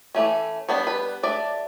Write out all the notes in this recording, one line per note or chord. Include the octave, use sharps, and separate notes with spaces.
E3 A3 C#4
G3 B3 D4 C#5
B4
F#3 A3 D4 D5